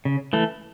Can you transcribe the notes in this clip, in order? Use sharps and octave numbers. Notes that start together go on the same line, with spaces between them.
C#3
E3 A3